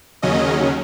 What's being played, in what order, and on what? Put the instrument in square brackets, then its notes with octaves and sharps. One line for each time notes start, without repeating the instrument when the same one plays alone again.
[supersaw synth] D#2 C#3 F#3 C#4 D#5